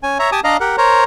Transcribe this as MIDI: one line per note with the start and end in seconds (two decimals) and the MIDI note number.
0.03 0.18 61
0.03 0.18 80
0.19 0.30 73
0.19 0.30 76
0.19 0.30 82
0.32 0.40 67
0.32 0.40 80
0.32 0.40 81
0.32 0.40 86
0.32 0.40 87
0.44 0.57 62
0.44 0.57 74
0.44 0.57 75
0.44 0.57 77
0.44 0.57 82
0.60 0.76 67
0.60 0.76 70
0.60 0.76 78
0.78 1.04 70
0.78 1.04 72
0.78 1.04 73
0.78 1.04 82